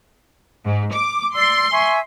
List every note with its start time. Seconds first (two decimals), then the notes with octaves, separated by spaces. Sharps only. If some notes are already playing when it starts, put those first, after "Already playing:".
0.65 G#2
0.93 D6
1.35 D5 C6 E6
1.72 E5 G#5 C#6